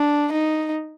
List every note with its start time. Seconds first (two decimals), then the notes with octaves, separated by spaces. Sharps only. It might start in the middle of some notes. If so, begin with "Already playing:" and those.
Already playing: D4
0.32 D#4